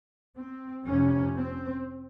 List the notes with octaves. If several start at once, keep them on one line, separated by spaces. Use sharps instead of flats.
C4
F1 F2 C3 C#4
C4